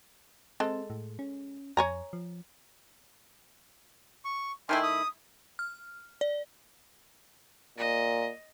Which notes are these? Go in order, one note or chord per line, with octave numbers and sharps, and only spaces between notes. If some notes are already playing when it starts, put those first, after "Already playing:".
G#3 C4 A4
A2
C#4
F2 C#5 G#5 A#5
F3
C#6
D#3 A3 E4 G5 G#5 C6
D#6
F6
D5
A#2 D#5